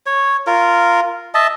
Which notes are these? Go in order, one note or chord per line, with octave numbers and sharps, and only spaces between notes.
C#5
F4 A#4
D#5 E5 A5